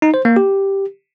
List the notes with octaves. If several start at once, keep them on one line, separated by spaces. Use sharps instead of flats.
D#4
C5
A#3
G4